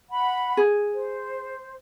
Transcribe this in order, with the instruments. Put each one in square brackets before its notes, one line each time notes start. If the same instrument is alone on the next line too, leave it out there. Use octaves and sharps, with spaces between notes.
[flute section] F#5 B5
[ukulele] G#4
[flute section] C5